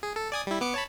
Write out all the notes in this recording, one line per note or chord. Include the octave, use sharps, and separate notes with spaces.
G#4
A4
D5 G#5 D#6
G3 E4
B3 D6 C#7
C#5 A5 B5